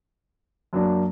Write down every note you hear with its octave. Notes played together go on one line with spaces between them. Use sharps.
F#2 F#3 A#3 D4